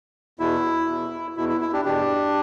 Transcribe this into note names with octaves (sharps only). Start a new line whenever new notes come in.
E2 B2 E4
E2 B2
E2 B2 E4
E4
E4
D4 G4
E2 B2 D4 G4